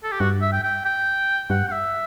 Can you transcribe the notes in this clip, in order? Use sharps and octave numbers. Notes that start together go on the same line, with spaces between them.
A4
G4
G2 F#4
E5
G5
G5
G5
G2 F#5
F#5
E5